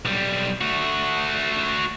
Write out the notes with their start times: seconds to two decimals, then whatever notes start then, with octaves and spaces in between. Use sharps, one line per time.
0.05 B1 G3
0.61 A3 F#4